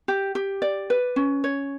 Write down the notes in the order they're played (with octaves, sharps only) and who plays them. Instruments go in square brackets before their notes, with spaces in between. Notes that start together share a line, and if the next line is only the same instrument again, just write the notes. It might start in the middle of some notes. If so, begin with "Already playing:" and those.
[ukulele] G4
G4
D5
B4
C#4
C#5